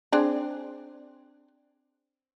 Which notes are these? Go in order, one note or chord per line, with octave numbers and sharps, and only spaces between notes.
C4 D4 G#4